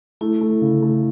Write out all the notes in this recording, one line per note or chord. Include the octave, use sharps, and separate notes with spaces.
A3 E4
A3
C#3
A3